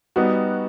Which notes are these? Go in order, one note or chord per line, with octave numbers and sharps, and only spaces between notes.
G3 B3 D#4 F#4